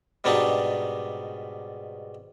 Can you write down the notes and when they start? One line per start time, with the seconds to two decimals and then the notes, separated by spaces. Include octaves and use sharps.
0.24 G#2 B2 G3 D4 D#4 C#6